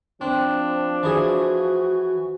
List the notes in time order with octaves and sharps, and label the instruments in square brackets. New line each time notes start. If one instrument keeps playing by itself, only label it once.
[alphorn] F3 [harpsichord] C4 [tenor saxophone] D4
[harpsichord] E3 G#4 [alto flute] F#4